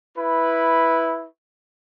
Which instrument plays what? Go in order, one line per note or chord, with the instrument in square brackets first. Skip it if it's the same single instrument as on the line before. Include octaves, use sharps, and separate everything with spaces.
[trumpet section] E4 B4